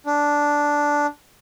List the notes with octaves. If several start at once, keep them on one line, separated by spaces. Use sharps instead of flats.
D4